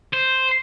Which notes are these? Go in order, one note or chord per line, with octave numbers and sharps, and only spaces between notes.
C5